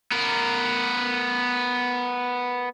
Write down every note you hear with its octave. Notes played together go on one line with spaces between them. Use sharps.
B3 A#4